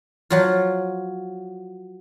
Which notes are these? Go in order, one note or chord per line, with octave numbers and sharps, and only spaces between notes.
F3 F#3 F4